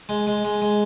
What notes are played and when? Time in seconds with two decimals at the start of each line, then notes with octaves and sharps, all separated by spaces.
0.09 G#3
0.27 G#3
0.45 G#3
0.62 G#3